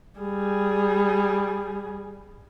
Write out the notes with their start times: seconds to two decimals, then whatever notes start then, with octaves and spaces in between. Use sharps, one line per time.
0.20 G3 G#4